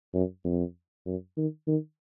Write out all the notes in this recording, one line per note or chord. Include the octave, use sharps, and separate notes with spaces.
F#2
F2
F#2
D#3
D#3